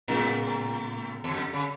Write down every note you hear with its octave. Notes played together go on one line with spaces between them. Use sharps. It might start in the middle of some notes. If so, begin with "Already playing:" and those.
A2 C#3 G#3 B3
E2
F#2
C#3